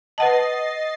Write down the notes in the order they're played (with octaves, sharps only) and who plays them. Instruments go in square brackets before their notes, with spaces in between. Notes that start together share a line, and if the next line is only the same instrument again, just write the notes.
[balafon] B4 F#5 A5 [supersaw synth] D#5 A6 C7